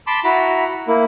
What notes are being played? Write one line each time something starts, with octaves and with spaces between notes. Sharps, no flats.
A5 B5 C6 D6
E4 F#4 A#5 B5
A#3 E4